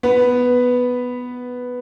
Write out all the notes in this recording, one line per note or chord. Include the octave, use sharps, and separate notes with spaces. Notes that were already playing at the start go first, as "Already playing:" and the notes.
B3 B4